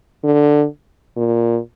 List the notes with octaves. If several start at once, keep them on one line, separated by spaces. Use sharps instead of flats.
D3
A#2